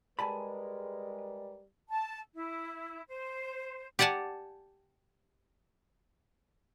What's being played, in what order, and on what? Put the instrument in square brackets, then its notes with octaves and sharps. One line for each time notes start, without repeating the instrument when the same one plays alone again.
[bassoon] G3 [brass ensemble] G#3 A#4 B4 [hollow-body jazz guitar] G#5 A5 B5
[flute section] A5
E4
C5
[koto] G4 D5 F#5 G#5 A5